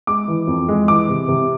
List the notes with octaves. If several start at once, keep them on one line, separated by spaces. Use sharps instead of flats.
G#3 D6
E3
F2
G#3
E3 D6
C3
C3